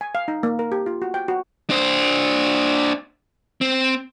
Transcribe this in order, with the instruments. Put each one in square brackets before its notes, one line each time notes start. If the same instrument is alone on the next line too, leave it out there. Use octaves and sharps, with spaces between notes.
[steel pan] G#5
F5
D#4
A#3
A#4
G4
F4
F#4
G5
F#4
[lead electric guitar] D4 C5
C4